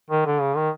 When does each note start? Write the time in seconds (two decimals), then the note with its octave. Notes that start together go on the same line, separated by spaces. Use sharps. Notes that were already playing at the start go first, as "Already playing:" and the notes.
0.10 D#3
0.26 D3
0.40 C#3
0.56 D#3